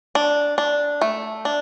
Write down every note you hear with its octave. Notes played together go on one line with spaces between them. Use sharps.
D4
D4
A3
D4